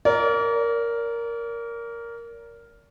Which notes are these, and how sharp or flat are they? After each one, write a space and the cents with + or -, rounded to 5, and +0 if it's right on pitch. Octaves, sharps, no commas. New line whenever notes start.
A#4 +0 D5 -40